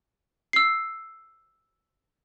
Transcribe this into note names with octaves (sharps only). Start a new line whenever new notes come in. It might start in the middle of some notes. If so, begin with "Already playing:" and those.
E6 C7